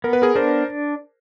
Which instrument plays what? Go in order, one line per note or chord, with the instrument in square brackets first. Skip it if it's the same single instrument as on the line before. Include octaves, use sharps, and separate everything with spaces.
[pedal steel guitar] B3 [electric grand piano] A#4
[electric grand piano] B4
G#4 A#4
[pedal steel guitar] D4 [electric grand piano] A#4 C5